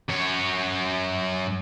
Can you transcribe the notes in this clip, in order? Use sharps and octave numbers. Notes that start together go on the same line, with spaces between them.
F#2 C#5